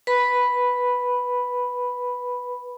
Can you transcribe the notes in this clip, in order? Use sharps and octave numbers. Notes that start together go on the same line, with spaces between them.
B4 B5